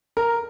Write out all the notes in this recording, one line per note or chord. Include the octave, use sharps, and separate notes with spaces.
A#4